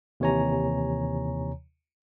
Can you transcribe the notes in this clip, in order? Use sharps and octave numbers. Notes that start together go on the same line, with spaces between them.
D#2 C3 E3 C#5 G#5 A#5